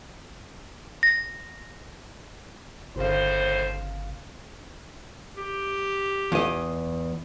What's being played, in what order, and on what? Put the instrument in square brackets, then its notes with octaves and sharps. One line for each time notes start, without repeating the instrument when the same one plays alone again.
[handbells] A#6
[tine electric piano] G1 C#3 F5 [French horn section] D#2 A2 C5
[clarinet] G4
[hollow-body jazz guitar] E2 D#5